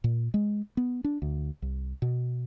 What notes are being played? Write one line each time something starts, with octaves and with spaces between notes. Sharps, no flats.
A#2
G#3
B3
D4
D2
C2
B2